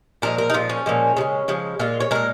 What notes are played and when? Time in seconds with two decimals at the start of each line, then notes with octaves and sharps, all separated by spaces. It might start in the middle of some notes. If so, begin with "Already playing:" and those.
0.22 A#2 F3 G#3 A#4
0.38 A#4
0.50 D#4
0.54 A#2 F3 G#3 F4
0.69 C#4
0.86 A#2 F3 G#3
1.17 C#3 F3
1.21 G#3
1.48 C#3 F3 G#3
1.79 A#2 G#3 F4
2.00 C#5
2.11 A#2 G#3 A#4